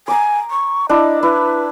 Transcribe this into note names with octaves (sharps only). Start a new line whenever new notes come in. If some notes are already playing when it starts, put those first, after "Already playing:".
G#5 A#5 D6
C#6
D4 E4 D#5
E4 B4